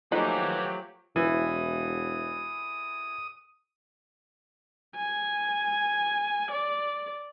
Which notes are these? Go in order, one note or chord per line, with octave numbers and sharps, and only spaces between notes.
F3 F#3 A3 A#3 D#4 G4 B4 G#5
E1 E3 D#6
G#5
D5